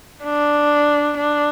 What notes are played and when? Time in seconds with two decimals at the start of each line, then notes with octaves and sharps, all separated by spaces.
0.24 D4
1.17 D4